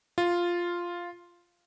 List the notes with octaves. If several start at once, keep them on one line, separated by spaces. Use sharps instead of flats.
F4